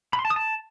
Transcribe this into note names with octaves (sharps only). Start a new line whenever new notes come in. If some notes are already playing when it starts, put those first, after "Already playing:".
B5
C6
A5
D#6
A5